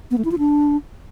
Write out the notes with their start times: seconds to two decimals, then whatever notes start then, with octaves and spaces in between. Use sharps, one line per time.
0.11 B3
0.18 A3
0.25 E4
0.32 F4
0.39 D4